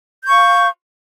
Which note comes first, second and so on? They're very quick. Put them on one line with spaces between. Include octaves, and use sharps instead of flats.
G6 C#6 F5